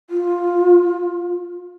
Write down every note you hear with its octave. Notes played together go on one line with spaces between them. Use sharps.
F4